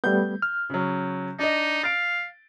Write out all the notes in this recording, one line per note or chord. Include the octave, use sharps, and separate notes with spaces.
G3 A3 B3 G6
F6
C#3 F#3
D4 D#4 D#5
F5 A6 D7